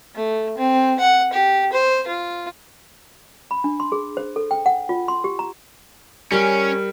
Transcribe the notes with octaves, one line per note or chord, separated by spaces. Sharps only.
A3
C4
F#5
G4
C5
F4
B5
D4
C6
G#4
C5
A4
G5
F#5
F4
C6
G4
A#5
G3 C#4 A#4 D7